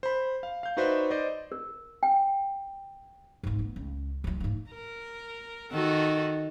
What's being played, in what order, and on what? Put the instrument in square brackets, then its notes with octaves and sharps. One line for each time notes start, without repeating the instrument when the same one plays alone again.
[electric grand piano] C5 B5
F5
F5 G6
D#4 F#4 B4 C5 D5 E5
C5 D5 D#5
[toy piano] A#4
G5
[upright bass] G#2 A#3
B3
C#2
D#3 F#3
G#2 A#3
[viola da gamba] A#4
D#3 F#4 A4